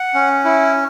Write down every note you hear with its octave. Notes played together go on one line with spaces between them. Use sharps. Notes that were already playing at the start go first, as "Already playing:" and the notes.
Already playing: F#5
C#4
E4